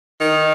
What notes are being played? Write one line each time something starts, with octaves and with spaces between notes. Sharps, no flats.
D#3